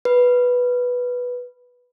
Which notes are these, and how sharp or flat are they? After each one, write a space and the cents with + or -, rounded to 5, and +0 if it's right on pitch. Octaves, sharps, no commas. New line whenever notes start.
B4 -5